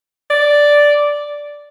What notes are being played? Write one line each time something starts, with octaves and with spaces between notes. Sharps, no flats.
D5